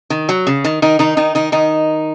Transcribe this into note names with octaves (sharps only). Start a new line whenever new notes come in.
D#3
F#3
C#3
D#3
D#3 D#4
D#3 D#4
D#3 D#4
D#3 D#4
D#3 D#4